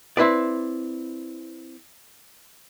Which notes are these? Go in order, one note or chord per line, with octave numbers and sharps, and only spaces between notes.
C4 E4 B4 D5